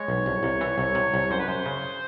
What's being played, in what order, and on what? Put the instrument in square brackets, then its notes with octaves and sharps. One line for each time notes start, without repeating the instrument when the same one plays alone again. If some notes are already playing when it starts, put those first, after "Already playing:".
Already playing: [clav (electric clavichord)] G#3 [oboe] C#5
[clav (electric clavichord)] B1
C2
C2
E3
[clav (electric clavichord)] C2 [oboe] C#5
[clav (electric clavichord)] C3
C2
[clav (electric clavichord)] F#2 [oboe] C5
[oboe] B4
[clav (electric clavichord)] F#2 [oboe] C5
[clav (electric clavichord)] C#3